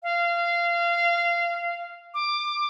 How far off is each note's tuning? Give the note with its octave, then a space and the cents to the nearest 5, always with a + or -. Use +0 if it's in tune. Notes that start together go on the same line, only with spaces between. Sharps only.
F5 -20
D6 +15